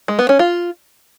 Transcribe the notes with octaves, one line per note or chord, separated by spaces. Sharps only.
G#3
B3
C#4
F4